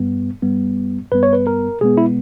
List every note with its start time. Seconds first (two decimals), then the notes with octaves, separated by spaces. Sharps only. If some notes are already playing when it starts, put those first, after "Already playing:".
Already playing: G2 G3 B3
0.42 G2 G3 B3
1.12 G2 G3 B3 B4
1.23 C#5
1.33 B4
1.47 A#4
1.81 B2 G#3 B3 G#4
1.97 E4